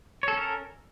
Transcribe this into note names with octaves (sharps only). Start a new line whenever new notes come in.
C#4 A4 A#4 C#5